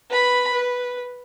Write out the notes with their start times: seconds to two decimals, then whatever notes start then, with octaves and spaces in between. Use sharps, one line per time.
0.10 B4 B5
0.53 B4